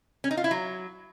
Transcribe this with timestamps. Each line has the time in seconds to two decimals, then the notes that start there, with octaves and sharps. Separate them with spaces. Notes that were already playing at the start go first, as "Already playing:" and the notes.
0.24 C#4
0.31 D#4
0.37 F4
0.44 E4
0.51 F#3